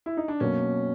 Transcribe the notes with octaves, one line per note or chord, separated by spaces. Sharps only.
E4
D#4
D4
B2 F#3 A#3 C#4